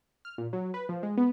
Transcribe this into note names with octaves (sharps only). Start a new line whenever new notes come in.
F6
A#2
F#3
B4
F3
G#3
B3